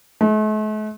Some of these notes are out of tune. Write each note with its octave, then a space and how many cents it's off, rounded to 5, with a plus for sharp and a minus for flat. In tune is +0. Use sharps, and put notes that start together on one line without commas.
A3 -45